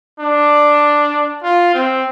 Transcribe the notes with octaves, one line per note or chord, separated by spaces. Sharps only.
D4
F4
C4